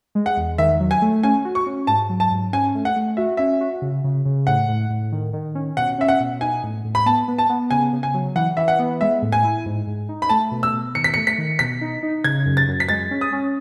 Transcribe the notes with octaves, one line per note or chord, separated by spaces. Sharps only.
G#3
F#5
E2
D#3 E5
F#3
G#5
A3
C#4 G#5
F#4
C#6
C#4
G#2 A5
F#3
A5
G#2
C#4 G#5
A3
F#5
A3
F#4 E5
C#4 E5
F#4
C#3
C#3
C#3
A2 F#5
A2
A2
D#3
D#3
C#4
B2 F#5
C#4 E5
F#5
B2
D#4 G#5
A2
A2
B5
B3 A5
B3
A5
B3
C#3 G#5
C#3
G#5
F#3
E3 F#5
E3 E5
F#5
B3
G#3 E5
A2
G#5
E4
G#2
G#2
D#4
B5
A3 A5
B2
E6
B2
D#3 C#7
B6
C#7
A3
B6
D#3
B2 B6
D#4
D#4
C#3 G#6
F#2
A6
F#2
B6
G#3 A6
C#4
D#6
C#4